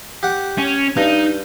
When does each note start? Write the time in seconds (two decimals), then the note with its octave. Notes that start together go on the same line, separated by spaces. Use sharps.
0.23 G4 F#5
0.58 C#4
0.97 G2 D#4